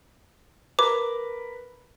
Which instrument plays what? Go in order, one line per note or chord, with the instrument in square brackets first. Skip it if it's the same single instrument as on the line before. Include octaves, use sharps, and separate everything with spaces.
[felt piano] A#4 B4 [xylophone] D6